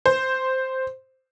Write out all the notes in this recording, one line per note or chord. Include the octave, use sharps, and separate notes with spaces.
C5